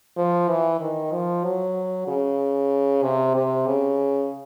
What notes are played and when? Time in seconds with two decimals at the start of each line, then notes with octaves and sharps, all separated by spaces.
0.17 F3
0.49 E3
0.80 D#3
1.12 F3
1.44 F#3
2.07 C#3
3.03 C3
3.35 C3
3.66 C#3